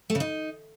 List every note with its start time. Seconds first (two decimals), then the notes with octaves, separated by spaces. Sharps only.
0.10 A3
0.15 C#3
0.20 D#4